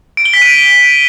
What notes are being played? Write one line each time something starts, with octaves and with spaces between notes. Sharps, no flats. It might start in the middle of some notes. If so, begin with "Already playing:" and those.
D7
G7
B6
D#7